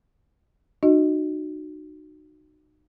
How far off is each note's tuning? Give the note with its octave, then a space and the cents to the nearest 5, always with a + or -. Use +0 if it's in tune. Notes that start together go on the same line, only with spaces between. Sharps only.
D#4 -35 F#4 +0 D#5 +0